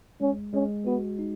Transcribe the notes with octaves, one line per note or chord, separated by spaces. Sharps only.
G#3 C#4
G#3 C#4
B3 F#4
D#4